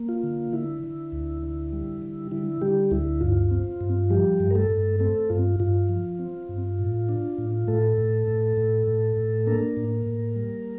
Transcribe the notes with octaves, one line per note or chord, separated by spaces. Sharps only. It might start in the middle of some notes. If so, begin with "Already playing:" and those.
Already playing: A#3
F4
D3
D3 E4
D3
D2
D3
G3
D3
D3 E4
D3 G3 G4
D2 E4
G2 F4
C4
G2
F3 G3 G4
G2
A#4
A3 A4
G2
A3 C4 A4
G2 F4
G2 F4
F3
C4
G2
A2
D4
A2
A2 A3 A4
A2
A2
A2
A2
A2
A#3 D4 A#4
A2
A2
G3